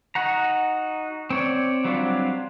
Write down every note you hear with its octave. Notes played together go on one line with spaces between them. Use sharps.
D#4 F#4 F#5 A#5
C4 C#5 D5
F#3 G3 C4 D4 F4